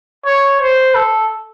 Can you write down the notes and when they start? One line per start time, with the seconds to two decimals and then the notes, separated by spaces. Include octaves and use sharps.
0.26 C#5
0.61 C5
0.95 A4